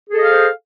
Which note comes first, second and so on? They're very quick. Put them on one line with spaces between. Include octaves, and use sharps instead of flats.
G#4 A4 D#5 F5 C5